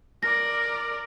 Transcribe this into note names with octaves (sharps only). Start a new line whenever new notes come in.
A#4 D5 A#6